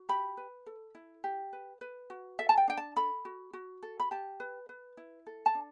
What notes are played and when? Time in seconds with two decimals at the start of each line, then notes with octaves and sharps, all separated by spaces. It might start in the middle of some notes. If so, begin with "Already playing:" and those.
Already playing: F#4
0.09 G4 B5
0.37 B4
0.66 A4
0.95 E4
1.24 G4
1.53 B4
1.81 B4
2.10 F#4
2.39 A4 E5
2.49 A5
2.57 G5
2.68 D4 G5
2.77 A5
2.96 A4 B5
3.25 F#4
3.53 F#4
3.83 A4
4.00 B5
4.11 G4 A5
4.40 B4
4.69 B4
4.97 E4
5.27 A4
5.46 A5
5.55 D4